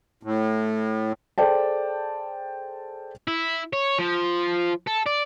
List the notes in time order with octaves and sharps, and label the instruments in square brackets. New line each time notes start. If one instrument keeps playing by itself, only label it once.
[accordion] A2
[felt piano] G#4 A4 C5 D5 G5 A5
[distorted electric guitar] E4
C#5
F3
A4
D5